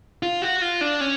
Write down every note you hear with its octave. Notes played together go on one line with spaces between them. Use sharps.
F4
F#4
F4
D4
C#4